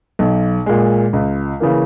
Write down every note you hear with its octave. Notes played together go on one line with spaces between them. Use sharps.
B1
A#2 G#3
C#2
C#3 E3 A#3